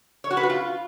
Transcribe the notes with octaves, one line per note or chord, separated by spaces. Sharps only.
C#5
F#4
B4
F#4
F4